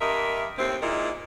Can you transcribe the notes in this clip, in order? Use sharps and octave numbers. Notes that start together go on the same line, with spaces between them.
G2 A#3 A#4 D#5 E5
D#2 A2 C4
A#2 G#3 D#4 E4 A#4